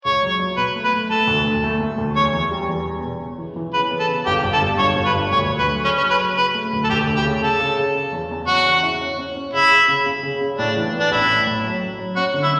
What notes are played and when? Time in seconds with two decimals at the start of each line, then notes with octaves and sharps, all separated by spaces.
0.05 C#2 C#5
0.23 F#3
0.40 F#3
0.57 B2 B4
0.76 A3
0.84 B4
0.93 A3
1.10 A3 A4
1.28 D2
1.45 D2
1.64 A3
1.80 A3
1.98 D2
2.16 E2 C#5
2.33 E2
2.51 G3
2.69 E2
2.85 E1
3.03 B2
3.21 C#3
3.38 E3
3.56 E3
3.73 C#3 B4
3.91 B3
4.00 A4
4.09 C#3
4.26 G1 G4
4.44 G1
4.53 A4
4.62 G2
4.79 G1 C#5
4.96 G1
5.06 B4
5.15 G2
5.32 D2 C#5
5.50 D2
5.59 B4
5.68 F#3
5.85 C#3 C#4
5.98 C#4
6.03 F#3
6.11 B4
6.19 F#3
6.37 C#3 B4
6.54 A3
6.73 D2
6.84 A4
6.90 D2 G4
7.07 D2
7.16 G4
7.24 C#3
7.42 C#3 A4
7.60 C#3
7.77 C#3
7.96 C#3
8.13 E2
8.31 E2
8.47 C#4 F#4
8.66 C#3
8.83 E4
9.01 C#4
9.19 C#4
9.36 C#4
9.53 C#3 E4
9.71 C#3
9.88 C#3
10.06 C#3
10.23 C#3
10.41 C#3
10.58 A2 D4
10.77 E3
10.93 B3
11.00 D4
11.12 A1 E4
11.29 A2
11.47 A2
11.64 F#3
11.82 C#4
11.99 F#3
12.16 C#4 F#4
12.34 D3
12.43 E4